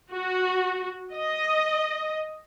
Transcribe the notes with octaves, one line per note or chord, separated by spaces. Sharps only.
F#4
D#5